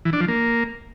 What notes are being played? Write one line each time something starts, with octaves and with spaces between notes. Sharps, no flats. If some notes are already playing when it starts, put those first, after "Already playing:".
E3
D4
F3
A#3